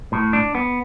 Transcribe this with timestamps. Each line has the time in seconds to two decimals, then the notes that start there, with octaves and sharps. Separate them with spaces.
0.12 A2
0.33 D4
0.55 B3